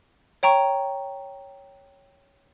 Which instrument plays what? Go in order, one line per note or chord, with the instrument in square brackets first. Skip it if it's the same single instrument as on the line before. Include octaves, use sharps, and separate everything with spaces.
[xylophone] C#5 G5 A#5 C#6